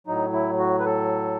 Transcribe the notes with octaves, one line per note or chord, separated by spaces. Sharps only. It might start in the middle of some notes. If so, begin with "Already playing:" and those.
A2 F#3 D#4
E4
F#4
B4
A4